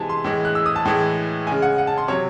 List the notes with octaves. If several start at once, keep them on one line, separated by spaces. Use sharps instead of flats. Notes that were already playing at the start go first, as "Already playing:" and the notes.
Already playing: C3 E3 G#3 G#5 A5
C6
A2 E3 G#3
F#6
E6
D#6
A5
A2 E3 G#3
C#3 G#3 G#5
F#5
F#5
A5
C6
C3 F#3 C#5